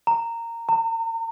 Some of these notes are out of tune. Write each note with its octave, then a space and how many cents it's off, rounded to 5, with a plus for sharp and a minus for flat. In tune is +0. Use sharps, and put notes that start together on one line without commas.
A#5 -15
A#5 -40